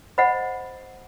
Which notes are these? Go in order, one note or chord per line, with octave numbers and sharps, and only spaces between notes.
C5 D#5 F#5 B5